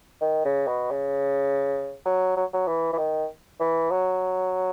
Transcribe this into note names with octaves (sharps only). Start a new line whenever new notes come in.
D#3
C#3
B2
C#3
F#3
F#3
F#3
E3
E3
D#3
E3
F#3